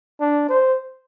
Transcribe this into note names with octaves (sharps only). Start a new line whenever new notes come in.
D4
C5